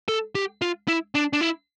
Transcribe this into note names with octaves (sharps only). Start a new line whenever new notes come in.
A4
G4
F4
E4
D4
D4
E4